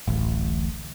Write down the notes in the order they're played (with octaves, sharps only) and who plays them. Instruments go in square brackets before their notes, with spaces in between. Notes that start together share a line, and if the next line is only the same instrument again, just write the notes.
[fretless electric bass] D1 A1